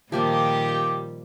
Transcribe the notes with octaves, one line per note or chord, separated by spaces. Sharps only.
A#2 D#3 F3 G3 A#3 F4 G4